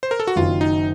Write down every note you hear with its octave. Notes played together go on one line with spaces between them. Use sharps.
C5
A#4
A4
F#4
F#1 F#2 D#3 F#3 F4
D#4